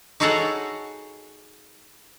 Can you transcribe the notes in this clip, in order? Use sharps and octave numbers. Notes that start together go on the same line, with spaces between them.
D#4 F#4 G#4 A4 C#5 F#5